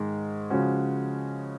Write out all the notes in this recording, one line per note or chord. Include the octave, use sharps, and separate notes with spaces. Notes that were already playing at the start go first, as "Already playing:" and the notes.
Already playing: G#2 D#3 G#3
C#3 F3 G#3 C#4 F#4